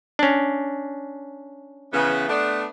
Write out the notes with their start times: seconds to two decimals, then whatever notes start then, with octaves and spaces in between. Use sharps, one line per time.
0.19 C#4 D4
1.93 C#3 E3 B3
2.28 A3 B3 D4